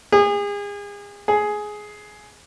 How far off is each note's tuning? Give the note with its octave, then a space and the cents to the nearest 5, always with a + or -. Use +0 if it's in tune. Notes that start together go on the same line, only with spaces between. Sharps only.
G#4 -35
G#4 +10